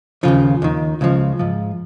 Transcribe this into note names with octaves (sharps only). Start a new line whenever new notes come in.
D#2 C#3 F3 F4
D#2 D#3
C#2 C#3 F3
G#2 F3